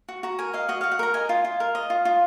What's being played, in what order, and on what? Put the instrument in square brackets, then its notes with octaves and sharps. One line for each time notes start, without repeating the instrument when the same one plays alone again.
[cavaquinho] F#4
F#4 A#5
A#4 G#5
D#5 F5
F#4 D#5
F#4 F5
F#5
A#4 A#5
D#5 G#5
F4
F4
A#4
D#5
F4
F4